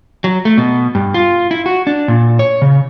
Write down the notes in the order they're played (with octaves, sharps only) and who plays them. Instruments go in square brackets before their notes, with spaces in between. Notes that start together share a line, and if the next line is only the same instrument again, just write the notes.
[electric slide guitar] F#3
A3
B2
G2
F4
E4
F#4
D4
A#2
C#5
C#3